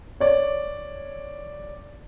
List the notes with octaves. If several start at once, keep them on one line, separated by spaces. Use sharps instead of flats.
C#5 D5